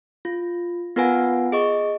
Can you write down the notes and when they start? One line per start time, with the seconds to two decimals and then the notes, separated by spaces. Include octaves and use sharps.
0.25 F4
0.96 B3 F4 A#4 B4 F#5 G#5
1.52 G#4 D#5 C#6